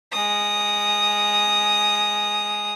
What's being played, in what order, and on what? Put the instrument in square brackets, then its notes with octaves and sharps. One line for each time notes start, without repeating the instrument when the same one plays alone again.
[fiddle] G#3 D#6